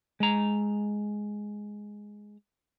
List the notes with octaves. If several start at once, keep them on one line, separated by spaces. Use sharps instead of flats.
G#3 A#5